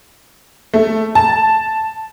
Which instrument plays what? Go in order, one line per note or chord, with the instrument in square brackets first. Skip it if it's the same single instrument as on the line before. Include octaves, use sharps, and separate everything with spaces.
[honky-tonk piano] A3
A5